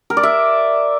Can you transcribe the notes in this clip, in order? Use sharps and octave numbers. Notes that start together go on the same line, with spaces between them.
A#4
D5
E5